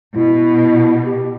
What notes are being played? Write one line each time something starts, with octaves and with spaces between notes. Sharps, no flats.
B2 E4
G4